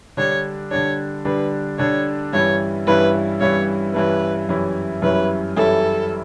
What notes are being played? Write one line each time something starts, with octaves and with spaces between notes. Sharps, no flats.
D3 G3 D4 C#5
D3 G3 D4 C#5
D3 G3 D4 B4
D3 G3 D4 C#5
G2 E3 G3 C#4 E4 C#5
G2 E3 G3 C#4 E4 B4
G2 E3 G3 C#4 E4 C#5
G2 E3 G3 C#4 E4 B4
F#2 E3 G3 C#4 E4
F#2 E3 G3 C#4 E4 B4
F#2 E3 G3 C#4 E4 A4